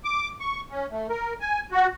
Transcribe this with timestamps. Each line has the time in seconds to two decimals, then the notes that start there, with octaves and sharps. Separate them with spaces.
0.04 D6
0.40 C#6
0.71 C#4
0.91 A3
1.09 A#4
1.41 G#5
1.72 F#4